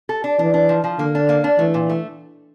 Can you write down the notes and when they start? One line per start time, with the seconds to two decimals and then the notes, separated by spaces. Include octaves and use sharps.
0.09 A4
0.24 D4
0.39 E3 D4
0.54 D4
0.69 F3
0.84 F3
0.99 D3 A#3
1.15 D4
1.29 A#3
1.44 D4
1.59 E3 A3
1.74 A#2
1.89 A3